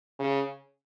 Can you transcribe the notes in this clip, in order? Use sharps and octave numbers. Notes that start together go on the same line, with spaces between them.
C#3